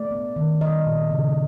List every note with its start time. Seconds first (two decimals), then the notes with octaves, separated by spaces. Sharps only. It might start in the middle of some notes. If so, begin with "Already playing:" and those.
Already playing: A3 D5
0.11 B3
0.36 D#3
0.61 G3 D#5
0.86 A#2
1.11 C#3